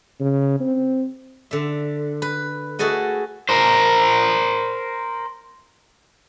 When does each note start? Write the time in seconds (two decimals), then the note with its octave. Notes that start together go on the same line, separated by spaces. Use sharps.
0.20 C#3
0.60 C4
1.51 D3 E5
2.22 B4
2.79 A3 F#4 G#4 A4 D#5 F#5
3.49 A#4 C5